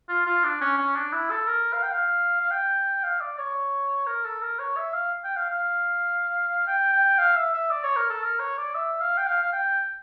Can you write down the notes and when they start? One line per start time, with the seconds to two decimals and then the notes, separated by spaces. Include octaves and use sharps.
0.09 F4
0.26 F4
0.44 D4
0.61 C#4
0.78 C#4
0.96 D4
1.13 E4
1.31 A4
1.47 A#4
1.73 F5
1.83 G5
1.92 F5
2.41 F5
2.51 G5
3.04 F5
3.21 D5
3.38 C#5
4.07 A#4
4.25 A4
4.42 A#4
4.60 C#5
4.77 E5
4.94 F5
5.24 G5
5.37 F5
5.51 F5
6.67 G5
6.93 G5
7.19 F5
7.36 E5
7.54 E5
7.71 D5
7.84 C#5
7.97 A#4
8.10 A4
8.23 A#4
8.40 C#5
8.58 D5
8.75 E5
9.01 F5
9.18 G5
9.27 F5
9.43 F5
9.53 G5